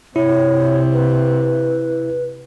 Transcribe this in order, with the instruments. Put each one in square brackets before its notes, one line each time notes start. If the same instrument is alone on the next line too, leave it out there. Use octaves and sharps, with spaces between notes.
[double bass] C3 [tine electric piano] E4 [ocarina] C#5
[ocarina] B4